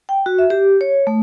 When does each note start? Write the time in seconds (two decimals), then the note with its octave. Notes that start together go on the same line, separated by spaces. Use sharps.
0.09 G5
0.26 F#4
0.39 E5
0.50 G4
0.81 C#5
1.07 A3